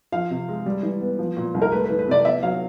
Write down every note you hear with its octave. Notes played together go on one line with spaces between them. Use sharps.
F3 F5
C3
G#3
G3
E3
B3
F3
A#2
C2
A#4
A3 B4
B4
E3
B4
C3 D5
B3 E5
F#3 F5